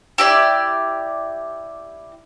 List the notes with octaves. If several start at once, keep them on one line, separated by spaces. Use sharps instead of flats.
E4 G4 D5